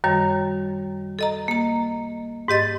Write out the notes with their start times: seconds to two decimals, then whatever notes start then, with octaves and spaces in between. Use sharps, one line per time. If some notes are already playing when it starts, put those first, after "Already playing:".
0.04 F#2 D#3 G3 C#5
1.19 A4 D#5 A#5
1.48 A#3 A#5
2.48 G#2 G4 D#5 A6